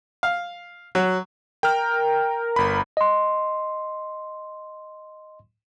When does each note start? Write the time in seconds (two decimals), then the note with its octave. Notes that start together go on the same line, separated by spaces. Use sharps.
0.23 F5
0.95 F#3
1.63 A#4 G5 F6
2.56 G1 B5
2.97 D#5 C6